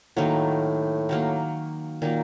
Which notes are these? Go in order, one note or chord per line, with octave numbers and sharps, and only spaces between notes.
A2 D#3 F#3 A#3
D#3 F#3 A#3
A#2 D#3 F#3 A#3